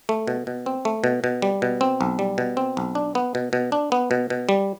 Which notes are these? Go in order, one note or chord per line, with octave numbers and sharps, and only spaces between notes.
A3
B2
B2
C4
A3
B2
B2
G3
B2
C4
B1
G3
B2
C4
B1
D4
B3
B2
B2
D4
B3
B2
B2
G3